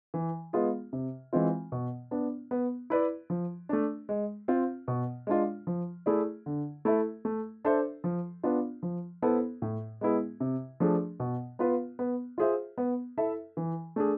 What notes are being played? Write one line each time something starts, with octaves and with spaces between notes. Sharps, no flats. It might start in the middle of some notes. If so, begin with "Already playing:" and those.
E3
G#3 B3 F4 G#4
C3
E3 G#3 C4 F4
B2
B3 D4
B3
E4 B4 D5
F3
A3 D4
G#3
C4 F4
B2
G#3 D4 F4
F3
A3 E4 G#4 D5
D3
A3 E4 A4 E5
A3
D4 A4 C5 E5
F3
B3 D4 F4
F3
B3 E4 A4 C5
A2
G#3 B3 E4 G#4
C3
F3 A3 D4 G#4
B2
B3 F4 B4
B3
F4 G#4 C5 E5
B3
E4 A4 E5
E3
A3 D4 G#4